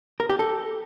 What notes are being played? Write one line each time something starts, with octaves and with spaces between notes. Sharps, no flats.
A#4
G4
A4